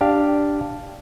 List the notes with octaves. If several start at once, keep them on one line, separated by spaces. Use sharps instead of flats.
D4 G4 F5